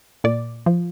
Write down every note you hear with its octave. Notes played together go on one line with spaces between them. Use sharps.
A#2 D5
F3